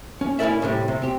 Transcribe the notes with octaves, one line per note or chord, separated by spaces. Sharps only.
C#4
C#4 E4 G4 A#4 D5 E5
A2 C3 G3
C3
C4 G4